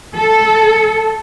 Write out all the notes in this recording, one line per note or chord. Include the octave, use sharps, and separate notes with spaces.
A4